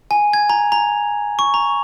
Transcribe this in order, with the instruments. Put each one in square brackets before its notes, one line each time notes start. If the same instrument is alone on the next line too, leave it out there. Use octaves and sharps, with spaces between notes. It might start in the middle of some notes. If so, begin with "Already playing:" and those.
[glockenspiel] G#5
G#6
A#5
A#5
C#6
A#5